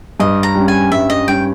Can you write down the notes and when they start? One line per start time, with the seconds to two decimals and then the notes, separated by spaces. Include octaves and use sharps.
0.20 G2 D#5
0.43 A#5
0.55 G3 C#4
0.68 G#5
0.92 G2 E5
1.10 D#5
1.27 G3 C#4 G5